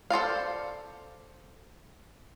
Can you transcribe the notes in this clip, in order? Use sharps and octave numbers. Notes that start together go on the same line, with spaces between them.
A4 C5 D5 F5